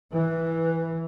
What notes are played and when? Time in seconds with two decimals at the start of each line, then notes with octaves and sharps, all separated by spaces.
0.13 E3 B4